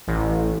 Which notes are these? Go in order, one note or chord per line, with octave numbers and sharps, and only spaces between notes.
A1